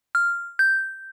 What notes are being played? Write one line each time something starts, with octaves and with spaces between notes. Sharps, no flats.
F6
G6